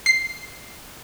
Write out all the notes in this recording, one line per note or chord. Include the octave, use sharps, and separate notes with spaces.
C7